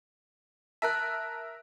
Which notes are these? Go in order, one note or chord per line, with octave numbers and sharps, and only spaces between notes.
A#4 E5 A5 F#6